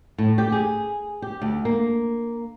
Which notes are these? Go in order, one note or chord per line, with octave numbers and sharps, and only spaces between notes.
A2
G4
G#4
G4
D2
A#3